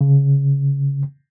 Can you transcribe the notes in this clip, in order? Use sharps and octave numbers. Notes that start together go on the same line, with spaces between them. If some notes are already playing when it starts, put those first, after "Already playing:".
C#3